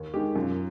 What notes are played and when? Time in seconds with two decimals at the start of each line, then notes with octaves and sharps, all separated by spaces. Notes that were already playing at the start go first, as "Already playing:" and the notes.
Already playing: D#2
0.14 D#3 G#3 G4
0.35 F#2 F4